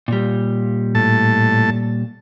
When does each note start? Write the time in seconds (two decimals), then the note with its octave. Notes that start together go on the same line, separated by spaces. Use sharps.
0.08 A#2 G3
0.95 A2 A5